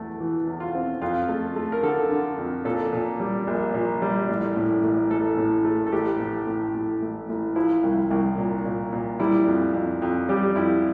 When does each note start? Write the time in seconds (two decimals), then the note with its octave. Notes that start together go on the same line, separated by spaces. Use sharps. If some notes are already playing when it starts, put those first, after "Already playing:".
Already playing: E2 A3
0.20 E3
0.47 E2
0.60 F4
0.75 C4
1.02 F2 F4
1.29 A3
1.56 A3
1.72 A#4
1.83 D3 A4
2.11 D3
2.38 F2
2.65 A#2 A4
2.93 A#2
3.20 G3
3.47 A#1
3.74 A#2
4.02 G3
4.29 A1
4.57 A2
4.84 A1
5.11 A1 A4
5.37 A2
5.65 A3
5.87 A4
5.92 A1 G4
6.20 A2
6.47 A2
6.75 A2
7.02 A1
7.29 A1
7.56 F3 E4
7.83 C2
8.11 C2
8.38 A#2
8.65 A#2
8.93 A#2
9.20 G3 E4
9.47 F2
9.74 F2
10.02 F2
10.29 G3 G4
10.56 F2 E4